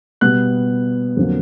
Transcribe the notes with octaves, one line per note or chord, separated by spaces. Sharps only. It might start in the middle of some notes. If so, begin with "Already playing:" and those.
B2 G3 B3 F#6
F2 D3 F#3 A#3